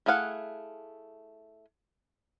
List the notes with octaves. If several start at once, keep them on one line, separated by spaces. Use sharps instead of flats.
A3 E4 G#4 F5 F#5